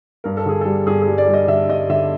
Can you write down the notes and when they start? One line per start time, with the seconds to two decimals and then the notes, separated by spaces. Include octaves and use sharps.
0.24 G2 A#4
0.37 A4
0.46 D3 G#4
0.61 G3 A4
0.86 G2 G#4
1.02 G#4
1.07 G3
1.18 D5
1.28 G3
1.34 D#5
1.48 D3 E5
1.69 G2 D#5
1.89 D3 E5